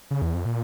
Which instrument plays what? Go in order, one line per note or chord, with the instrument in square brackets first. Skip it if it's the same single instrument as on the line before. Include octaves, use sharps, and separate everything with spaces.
[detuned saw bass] C#3
E2
F2
A#2